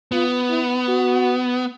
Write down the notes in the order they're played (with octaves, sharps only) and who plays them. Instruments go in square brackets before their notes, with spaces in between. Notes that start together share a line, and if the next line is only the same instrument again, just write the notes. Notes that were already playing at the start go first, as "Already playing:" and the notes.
[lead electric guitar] B3 [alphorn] F4
[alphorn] E4
F#4